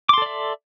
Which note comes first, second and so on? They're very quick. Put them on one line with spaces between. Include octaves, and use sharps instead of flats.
D6 C6 A4 D5 E5